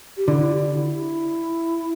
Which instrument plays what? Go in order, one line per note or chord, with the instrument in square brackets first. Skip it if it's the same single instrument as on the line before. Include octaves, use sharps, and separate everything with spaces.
[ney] G4
[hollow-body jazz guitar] D3 [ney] E4
[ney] E4
G4
E4